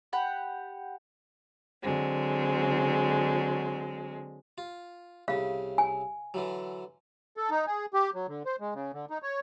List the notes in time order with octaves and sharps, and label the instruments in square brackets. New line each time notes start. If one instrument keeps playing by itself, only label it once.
[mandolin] G4 F#5 B5
[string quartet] D3 F#3 G#3 C4
[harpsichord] F4
[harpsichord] C2 C#3 [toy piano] F5
[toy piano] G#5
[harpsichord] D3 E3 F#3
[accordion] A4
D#4
G#4
G4
F#3
D3
C5
G#3
C#3
D3
D#4
C#5